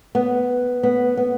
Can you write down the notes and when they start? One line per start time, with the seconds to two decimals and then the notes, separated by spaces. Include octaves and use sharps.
0.15 B3
0.83 B3
1.17 B3